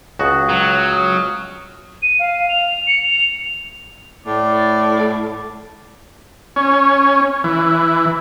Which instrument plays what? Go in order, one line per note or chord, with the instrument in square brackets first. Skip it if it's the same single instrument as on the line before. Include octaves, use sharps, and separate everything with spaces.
[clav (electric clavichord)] C#2 F#4 [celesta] D#6
[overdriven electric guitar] F#3
[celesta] D#6 F6
[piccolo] D#7
F5
F7
C#7
F7
[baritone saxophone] A2 [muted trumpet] D5
[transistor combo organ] C#4
E3